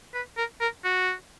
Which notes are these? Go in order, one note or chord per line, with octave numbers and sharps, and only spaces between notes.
B4
A#4
A#4
F#4